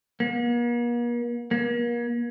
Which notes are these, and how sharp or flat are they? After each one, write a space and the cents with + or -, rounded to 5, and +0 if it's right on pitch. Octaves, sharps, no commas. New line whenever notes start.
A#3 +45
A#3 +35